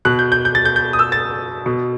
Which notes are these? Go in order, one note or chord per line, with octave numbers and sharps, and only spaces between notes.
B2 F#6
G6
G6
G6
A6
G6
G6
D#6
E6
A6
B2